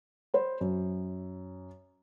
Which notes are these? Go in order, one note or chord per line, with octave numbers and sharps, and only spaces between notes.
C5 B5
F#2